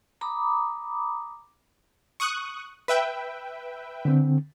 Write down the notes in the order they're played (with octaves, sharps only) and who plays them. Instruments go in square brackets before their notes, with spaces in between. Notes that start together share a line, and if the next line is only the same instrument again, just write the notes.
[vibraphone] A#5 B5 D6 D#6
[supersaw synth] C#6 D#6 F#6
B4 E5 G5
[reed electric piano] D3 C4